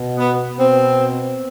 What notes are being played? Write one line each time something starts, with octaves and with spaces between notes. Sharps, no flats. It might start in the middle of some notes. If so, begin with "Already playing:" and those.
Already playing: B2
B3
B2 C4